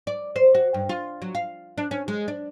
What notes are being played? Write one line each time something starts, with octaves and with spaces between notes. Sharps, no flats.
D5
C5
F#4
G2
F4
F#3
F5
D4
C#4
G#3
D4